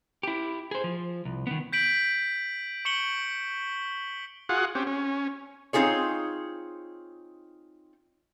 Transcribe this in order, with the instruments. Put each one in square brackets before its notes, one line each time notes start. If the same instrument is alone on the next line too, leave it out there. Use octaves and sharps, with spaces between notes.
[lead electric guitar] E4 G4
G#4 C5
F3
C2
D#3 B3
[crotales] G6 B6 D7 F#7
C#6 C#7 F#7 G7
[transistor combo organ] F4 F#4 G#4 F#5
C4 C#4 G4
C#4
[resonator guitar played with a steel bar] C4 D#4 F4 G#4 C#5